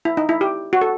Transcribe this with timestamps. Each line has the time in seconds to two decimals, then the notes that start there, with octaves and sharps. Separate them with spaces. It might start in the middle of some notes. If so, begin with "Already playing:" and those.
0.05 E4
0.17 D#4
0.29 E4
0.41 G4
0.73 F#4
0.81 A4